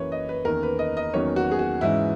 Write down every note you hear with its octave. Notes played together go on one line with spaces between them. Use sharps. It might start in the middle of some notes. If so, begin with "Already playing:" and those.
Already playing: F#2 E3 A#3 B4 C#5
D#5
B4
E2 D#3 A#3 C#4 A#4
B4
D#5
D#5
E2 D#3 F#3 A#3 C#4 C#5
F#4
G#4
F#4
G#2 E3 G#3 C#4 E4